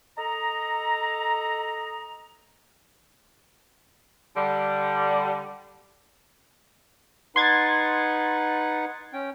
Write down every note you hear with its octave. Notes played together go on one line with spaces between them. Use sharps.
A4 D#5 A#5
D3 G3
D#4 B4 F#5 C6 G#6 A6
C#4 G5